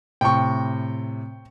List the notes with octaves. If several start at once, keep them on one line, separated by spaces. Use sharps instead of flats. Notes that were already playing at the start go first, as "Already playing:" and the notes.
A2 C3 G5 C#6